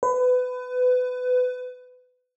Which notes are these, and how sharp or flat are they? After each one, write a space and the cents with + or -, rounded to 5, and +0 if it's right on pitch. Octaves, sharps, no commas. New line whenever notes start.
B4 +25